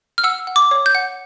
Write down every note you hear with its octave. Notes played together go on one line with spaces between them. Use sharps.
F6
F#5 E6
F#5
D6
C#5
G6
F#5